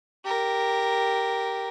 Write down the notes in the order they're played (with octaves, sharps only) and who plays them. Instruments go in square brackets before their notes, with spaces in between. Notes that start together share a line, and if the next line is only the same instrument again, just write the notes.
[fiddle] G4 A#4